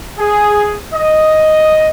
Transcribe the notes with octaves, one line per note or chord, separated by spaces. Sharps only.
G#4
D#5